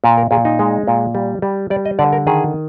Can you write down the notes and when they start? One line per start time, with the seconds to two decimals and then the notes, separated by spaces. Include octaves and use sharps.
0.04 A#2
0.17 A#4
0.31 A#2 G#4
0.45 D#4
0.59 G#3
0.87 A#2
1.15 G3
1.42 G3
1.70 G3 D5
1.85 D#5
1.99 D3 D5
2.13 A#4
2.27 D#3 G#4